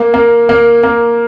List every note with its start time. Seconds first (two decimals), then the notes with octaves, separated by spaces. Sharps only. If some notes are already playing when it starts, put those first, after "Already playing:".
Already playing: A#3
0.14 A#3
0.49 A#3
0.83 A#3